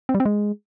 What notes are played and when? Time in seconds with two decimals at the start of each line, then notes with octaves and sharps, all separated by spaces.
0.09 C4
0.15 G3
0.20 C4
0.25 G#3